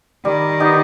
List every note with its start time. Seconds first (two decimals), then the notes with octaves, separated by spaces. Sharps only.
0.25 D#3 G3
0.60 B3 D#4 G4